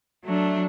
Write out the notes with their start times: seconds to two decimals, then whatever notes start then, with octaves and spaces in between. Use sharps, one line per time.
0.25 F#3 A3 D4